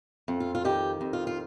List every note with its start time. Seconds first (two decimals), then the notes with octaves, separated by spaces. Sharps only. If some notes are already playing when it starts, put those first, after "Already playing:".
0.28 F2
0.40 F4
0.55 F4
0.65 D#3 G4
1.01 F2
1.13 F4
1.27 F4